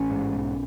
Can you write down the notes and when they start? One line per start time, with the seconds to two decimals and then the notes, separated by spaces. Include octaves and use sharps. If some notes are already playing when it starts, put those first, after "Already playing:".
Already playing: A1 C#4
0.11 G#2
0.33 B1